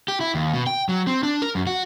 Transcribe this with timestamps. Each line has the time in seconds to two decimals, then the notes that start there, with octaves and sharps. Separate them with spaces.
0.08 G4
0.20 E4
0.35 D#2
0.54 B2
0.67 G5
0.89 F#3
1.07 C4
1.23 D4
1.42 A#4
1.55 F#2
1.67 F#4